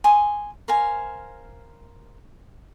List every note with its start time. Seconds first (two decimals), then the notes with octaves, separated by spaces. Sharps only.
0.04 G#5 C6 D#6
0.68 A#4 C5 F5 G#5